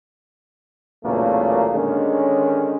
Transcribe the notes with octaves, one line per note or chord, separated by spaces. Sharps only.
B1 E2 A#2 C#3 A3 A#3
D3 D#3 G#3 C#4